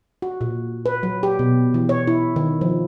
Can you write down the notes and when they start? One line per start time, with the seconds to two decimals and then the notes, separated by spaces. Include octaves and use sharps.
0.22 F#4
0.41 A#2
0.86 B4
1.03 F#3
1.23 G4
1.39 B2
1.74 E3
1.89 C#5
2.07 E4
2.36 D#3
2.61 F3